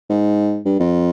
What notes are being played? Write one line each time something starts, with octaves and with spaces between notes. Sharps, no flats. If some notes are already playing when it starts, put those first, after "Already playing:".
G#2
G2
F2